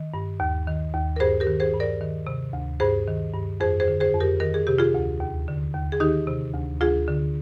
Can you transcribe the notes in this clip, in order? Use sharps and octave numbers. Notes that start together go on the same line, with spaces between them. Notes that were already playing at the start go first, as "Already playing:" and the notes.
Already playing: D#3
G2
D#2
D#3
D#2
A#4
G2 G#4 C5
G4 A#4
D#3
G#4 C5
G2
A#4 D5
D#3
C3
D2
G2 G#4 C5
D#3
G2
F2 G#4 C5
G#4 C5
D3
G#4 C5
F2
G4 A#4
D#3 A#4
G#4
C3 G4
F4 G#4
D2
D#2
D3
D#2
G#4
D#3 D#4 G4
C3
D2
D2 F4 G#4
D3